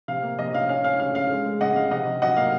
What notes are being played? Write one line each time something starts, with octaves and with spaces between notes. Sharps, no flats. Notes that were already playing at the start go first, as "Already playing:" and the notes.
C3 F5
A#3
C3 D#5
C#4 F5
C#4 F5
C#4 F5
C#3 F5
C#4 F5
G#3
G#3
C#3 D#5 F#5
C#3 F5
C3 D#5 F#5
C3
F#3 D#5 F#5
A#3 F5